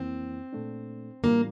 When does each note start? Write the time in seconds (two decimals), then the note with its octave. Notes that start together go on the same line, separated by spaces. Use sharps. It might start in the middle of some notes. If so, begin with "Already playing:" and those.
Already playing: F2 E3 A#3 C4 E4
0.53 A#2 A3 D4
1.24 A2 E3 G3 A#3 D4 F4